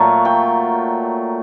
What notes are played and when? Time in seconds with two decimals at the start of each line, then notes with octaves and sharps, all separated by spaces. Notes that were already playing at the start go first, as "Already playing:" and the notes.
Already playing: A#2 F#3 A3 F5
0.25 G5